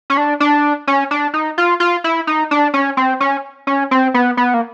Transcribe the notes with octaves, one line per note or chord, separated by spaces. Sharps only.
C#4
D4
D4
C#4
D4
D#4
F4
F4
E4
D#4
D4
C#4
C4
C#4
C#4
C4
B3
B3
A#3